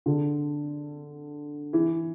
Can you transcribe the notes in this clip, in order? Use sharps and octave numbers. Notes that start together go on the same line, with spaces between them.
D3
E3